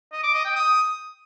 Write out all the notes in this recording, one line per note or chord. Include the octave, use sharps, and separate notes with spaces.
D#5
D6
D#5
G5
D#6